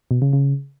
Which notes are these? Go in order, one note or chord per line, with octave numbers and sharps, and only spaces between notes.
B2
C#3
C#3